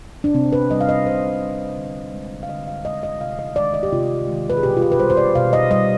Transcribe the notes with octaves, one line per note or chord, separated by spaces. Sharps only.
D4
C3 C4
B4
G3 D#5
F5
D#5
C3 C5
G3
D3
G#3
F5
D3 D#5
F5
G#3 D#5
D#5
C3 F5
D#5
D#3 G#3 D5
D#5
G4
C3 F4
D#3 G#3
B4
G#4
B2 G4
F4
G4
B4
G3 C5
C5
D5
B2 F5
D#5
G3 D#5